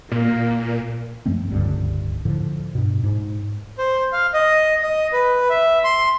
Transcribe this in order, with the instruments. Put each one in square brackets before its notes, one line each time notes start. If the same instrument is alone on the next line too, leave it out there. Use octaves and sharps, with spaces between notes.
[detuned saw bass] A#2 [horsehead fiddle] A#3
[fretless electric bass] F#2 F3 A3 C4
D1 C#2 G2 D3
A2 D3 F3
G2 B2
G#2
[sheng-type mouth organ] C5
F5
D#5
D#5
B4
E5
C6